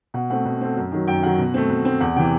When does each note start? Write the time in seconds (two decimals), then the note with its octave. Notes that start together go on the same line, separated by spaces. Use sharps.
0.14 B2 F#5
0.30 A3 C4 F#5
0.45 B2
0.61 A3 C4
0.77 F#2
0.92 D#3 F#3
1.07 F#2 G5
1.23 D#3 F#3 F#5
1.38 B2
1.54 A3 C4
1.70 B2
1.85 A3 C4
2.01 E2 F#5
2.16 C3 E3 G5